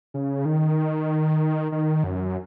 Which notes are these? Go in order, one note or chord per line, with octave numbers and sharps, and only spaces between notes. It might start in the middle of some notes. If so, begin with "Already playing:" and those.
C#3
D#3
D#3
F#2